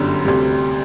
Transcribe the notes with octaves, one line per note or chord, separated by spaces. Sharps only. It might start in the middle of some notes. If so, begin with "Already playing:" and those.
Already playing: G1 F#2 D3 G3
D2 C3 G3